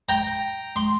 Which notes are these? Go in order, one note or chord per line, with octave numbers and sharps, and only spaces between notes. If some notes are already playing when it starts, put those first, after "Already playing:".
G5 A#5
C6